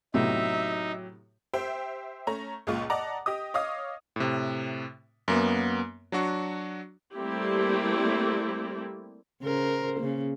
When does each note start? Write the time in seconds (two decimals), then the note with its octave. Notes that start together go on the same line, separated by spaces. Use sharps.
0.14 A2 C3 F#3 B3 D#4 G4 E5
1.54 G4 C5 E5 G5
2.27 A3 C#4 A#5
2.67 C#2 A#2 G#3 F4 C#6
2.90 D5 D#5 F#5 A5 A#5 D6
3.26 G4 D#5 D#6
3.54 C#5 D#5 F5 D6 D#6
4.16 A2 C3
5.28 F#2 A#3 B3
6.12 F#3 D4 F#4 C#6
7.14 G3 A3 A#3 C4 E4 G4
9.42 C#3 A#4 C5
10.00 C#3 A#3